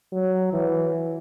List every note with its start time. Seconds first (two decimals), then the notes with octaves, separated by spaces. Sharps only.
0.12 F#3
0.53 E3